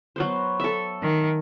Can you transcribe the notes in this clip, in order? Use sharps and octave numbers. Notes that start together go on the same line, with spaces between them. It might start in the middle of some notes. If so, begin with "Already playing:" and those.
F#3 B3 C5
A4 E5
D#3